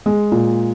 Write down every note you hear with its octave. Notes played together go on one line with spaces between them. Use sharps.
G#3
A#2